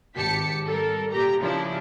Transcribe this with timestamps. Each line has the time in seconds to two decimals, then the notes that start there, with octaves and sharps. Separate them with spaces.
0.16 G#1 G4 A5 B6 C#7
0.66 G3 A4 A#4
1.11 A#2 G4 A#5
1.42 C#3 F3 D4 E4